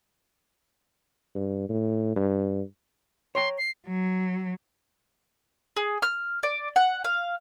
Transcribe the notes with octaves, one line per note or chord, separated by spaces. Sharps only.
G2
A2
G2
C#5 G5 A#5 C6
C7
F#3
G#4
F6
D5
F#5
F5